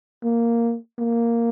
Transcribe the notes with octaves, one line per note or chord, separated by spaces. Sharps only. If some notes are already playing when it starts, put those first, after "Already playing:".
A#3
A#3